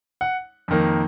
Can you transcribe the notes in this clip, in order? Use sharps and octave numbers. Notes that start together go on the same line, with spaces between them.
F#5
F2 D#3 A#3